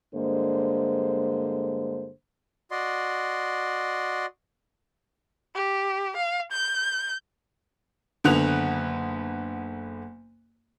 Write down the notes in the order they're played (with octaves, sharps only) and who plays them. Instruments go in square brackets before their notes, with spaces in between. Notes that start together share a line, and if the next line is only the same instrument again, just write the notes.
[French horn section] G2 D3 G#3 A#3 C5
[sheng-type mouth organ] F#4 D5 D#5 C6
[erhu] G4
F5
G6
[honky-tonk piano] F#1 D3 B3 F#6 F7